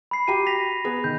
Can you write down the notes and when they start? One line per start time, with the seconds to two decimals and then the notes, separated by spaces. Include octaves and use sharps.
0.11 B5 C7
0.28 F#4 G4 A#5 D#7
0.47 A#6 B6 F7
0.84 B3 G#4
1.04 D#3 G6